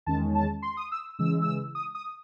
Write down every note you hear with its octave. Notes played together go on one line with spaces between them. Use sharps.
E2 D#3 G#3 C#4 A5
A5
C6
D#6
E6
C#3 E3 G#3 E6
E6
D#6
D#6